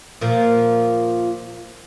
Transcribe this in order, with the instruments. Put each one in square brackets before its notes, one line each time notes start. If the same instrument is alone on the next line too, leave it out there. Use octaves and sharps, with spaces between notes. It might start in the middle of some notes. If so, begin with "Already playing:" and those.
[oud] A#2 F3 A#3